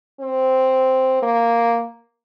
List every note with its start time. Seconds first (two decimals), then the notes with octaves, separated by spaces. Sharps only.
0.20 C4
1.22 A#3